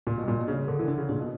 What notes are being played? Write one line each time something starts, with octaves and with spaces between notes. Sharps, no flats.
A#2 A#3
B2
G2
A#2 A#4
B2
C#3 D4
D3 A#4
E3
D3 D4
C#3
A#2 D4
B2